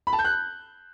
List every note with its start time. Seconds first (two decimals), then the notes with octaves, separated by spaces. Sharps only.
0.07 B5
0.13 A5
0.19 G6
0.25 F#6